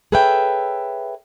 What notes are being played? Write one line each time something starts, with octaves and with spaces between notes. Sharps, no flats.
G#4 A4 B4 C#5 E5 G5